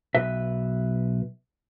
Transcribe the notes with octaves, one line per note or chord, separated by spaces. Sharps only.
B1 B4 E5